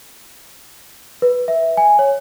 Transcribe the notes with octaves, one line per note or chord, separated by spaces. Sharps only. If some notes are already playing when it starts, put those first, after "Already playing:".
B4
E5
G#5
C#5